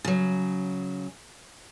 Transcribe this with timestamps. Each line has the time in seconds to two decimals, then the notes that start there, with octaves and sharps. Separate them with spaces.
0.04 C#3 F#3